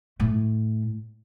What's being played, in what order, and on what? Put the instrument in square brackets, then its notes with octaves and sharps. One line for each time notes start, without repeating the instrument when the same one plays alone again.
[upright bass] A2 A3